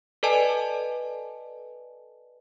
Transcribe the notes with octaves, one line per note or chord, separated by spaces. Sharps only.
A4 B4 D5 D#5 G#5 A5